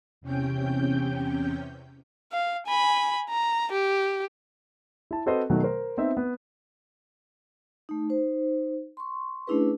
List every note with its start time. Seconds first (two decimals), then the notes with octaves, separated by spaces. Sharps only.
0.21 E2 C3 C#4 G5 G6
2.32 F5
2.67 G#5 B5
3.30 A#5
3.72 G4
5.11 E4 A5
5.26 C4 F#4 A4 B4 C5 D#5
5.50 B2 D#3 F#3 A3
5.64 A#4 C5
5.97 B3 C4 D#4 E5
6.17 B3
7.89 A3 D#4
8.09 D#4 C5
8.97 C6 C#6
9.47 A3 C#4 D4 E4 G#4 B4